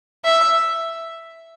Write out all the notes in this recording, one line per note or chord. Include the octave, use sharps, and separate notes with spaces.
E5